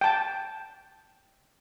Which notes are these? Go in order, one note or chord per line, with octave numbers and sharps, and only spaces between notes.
G5 A5